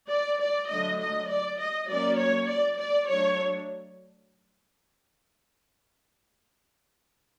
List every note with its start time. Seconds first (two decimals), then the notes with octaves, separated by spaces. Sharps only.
0.10 D5
0.40 D5
0.70 D3 F#3 A3 D#5
1.00 D#5
1.29 D5
1.59 D#5
1.89 F#3 A#3 C#4 D5
2.19 C#5
2.49 D5
2.79 D5
3.09 F#3 A3 D4 C#5